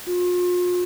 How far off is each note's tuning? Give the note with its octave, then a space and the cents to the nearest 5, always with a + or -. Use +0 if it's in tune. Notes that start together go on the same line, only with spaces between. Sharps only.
F4 +40